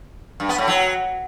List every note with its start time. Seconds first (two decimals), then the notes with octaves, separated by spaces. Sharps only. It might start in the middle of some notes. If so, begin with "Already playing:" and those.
0.40 G2
0.49 B3
0.58 A2
0.68 F#3